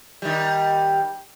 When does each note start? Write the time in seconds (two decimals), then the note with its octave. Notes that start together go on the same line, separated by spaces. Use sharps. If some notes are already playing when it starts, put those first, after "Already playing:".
0.22 D#3 G3